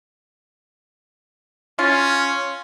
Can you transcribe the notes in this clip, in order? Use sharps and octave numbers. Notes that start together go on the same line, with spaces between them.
C#4 F4